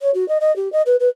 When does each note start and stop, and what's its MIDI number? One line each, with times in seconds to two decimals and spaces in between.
0.01 0.11 73
0.14 0.27 66
0.29 0.38 75
0.41 0.54 75
0.56 0.71 67
0.73 0.82 75
0.86 0.96 71
1.00 1.08 71